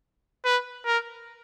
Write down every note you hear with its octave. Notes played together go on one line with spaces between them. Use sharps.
B4
A#4